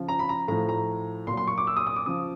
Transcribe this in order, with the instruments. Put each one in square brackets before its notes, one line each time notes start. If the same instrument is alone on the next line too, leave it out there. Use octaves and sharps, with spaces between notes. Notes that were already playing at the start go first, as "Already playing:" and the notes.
Already playing: [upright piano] C#3 F3
A#5
B5
A#5
A2 F3 A#5
A#5
A#2 C6
F#3
C6
C#6
D6
E6
D#6
D#6
D6
C#3 F3 D#6